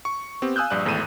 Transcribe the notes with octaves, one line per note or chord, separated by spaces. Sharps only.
C#6
B3 C4 G4
F5 G#5 D#6 E6 F#6 G6
A#1 G2 D5 F#6
G#1 E2 A2 A4 D#7 E7